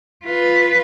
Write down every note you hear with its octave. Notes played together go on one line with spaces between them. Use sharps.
F4 B4